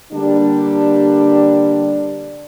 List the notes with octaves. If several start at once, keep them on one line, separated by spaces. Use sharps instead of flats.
D3 G3 A#3 D4